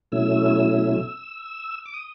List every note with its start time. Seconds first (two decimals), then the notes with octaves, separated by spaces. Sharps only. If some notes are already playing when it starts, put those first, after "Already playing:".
0.12 B2 F#3 A3 C#4 E4 E6
1.86 D6
1.94 D#6